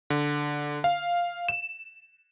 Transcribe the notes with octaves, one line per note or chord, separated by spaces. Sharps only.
D3
F5
E7